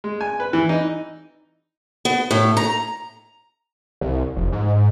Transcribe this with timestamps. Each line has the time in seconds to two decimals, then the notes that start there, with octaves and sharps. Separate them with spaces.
0.04 G#3
0.21 G#5
0.40 B4
0.53 E3
0.69 D#4
2.05 B3
2.31 A2
2.57 A#5
4.01 C2
4.36 F1
4.52 G#2